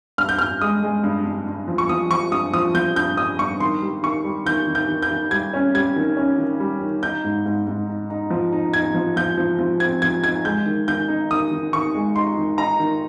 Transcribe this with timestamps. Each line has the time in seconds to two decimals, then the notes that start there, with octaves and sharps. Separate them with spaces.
0.18 G2 F6
0.29 G6
0.39 G2 F6
0.61 G#3 D#6
0.83 G#3
1.04 G2
1.25 G2
1.47 G2
1.68 F3
1.78 C#6
1.89 F3 D#6
2.11 F3 C#6
2.32 G2 D#6
2.54 F3 D#6
2.74 F3 G6
2.96 G2 G6
3.17 G2 D#6
3.39 G2 C#6
3.60 D#3 C6
3.82 G3
4.03 D#3 C#6
4.24 G3
4.45 D#3 G6
4.67 D#3
4.75 G6
4.88 D#3
5.02 G6
5.11 D#3
5.31 G3 G#6
5.54 C#4
5.74 G3 G#6
5.96 D#3
6.17 C#4
6.38 D#3
6.60 G3
6.81 D#3
7.03 D#4 G6
7.24 G#2
7.46 G#2
7.67 G#2
7.88 D#4
8.10 D#4
8.30 F3
8.52 D#4
8.74 D#4 G#6
8.94 F3
9.16 F3 G6
9.38 F3
9.59 F3
9.80 C4 G#6
10.02 F3 G#6
10.23 D#4 G#6
10.45 G#3 G6
10.66 D#3
10.88 D#3 G6
11.08 D#4
11.31 D#3 D#6
11.51 D#3
11.73 D#3 C#6
11.95 G#3
12.16 D#4 C6
12.37 D#3
12.58 D#4 A#5
12.79 D#3